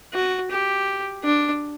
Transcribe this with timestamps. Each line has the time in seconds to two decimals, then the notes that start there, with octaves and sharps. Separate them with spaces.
0.13 F#4
0.50 G4
1.24 D4